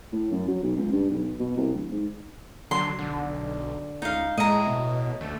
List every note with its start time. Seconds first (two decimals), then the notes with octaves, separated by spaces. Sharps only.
0.13 A2
0.32 F#2
0.48 F#3
0.63 B1
0.77 C#2
0.92 G2
1.10 B1
1.40 B2
1.57 C2
1.73 D1
1.91 G#2
2.71 D3 F#3 C6
2.99 B1 D3
4.02 C#2 D#4 F5
4.37 A2 G#3 D#5 A#5
4.67 B2
5.21 D2 A3